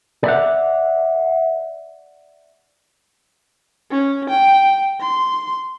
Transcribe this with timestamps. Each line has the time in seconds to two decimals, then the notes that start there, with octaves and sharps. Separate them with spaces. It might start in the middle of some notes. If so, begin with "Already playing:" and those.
0.24 D5 E5 F#5
3.91 C#4
4.30 G5
5.01 C6